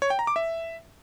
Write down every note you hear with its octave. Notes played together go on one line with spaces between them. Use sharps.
C#5
G5
A#5
D6
E5